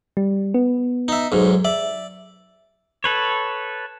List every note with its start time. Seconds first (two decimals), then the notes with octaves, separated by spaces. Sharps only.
0.17 G3
0.54 B3
1.08 D#4 E5
1.32 B1 G#2
1.65 D5 E5
3.04 A4 B4 C#5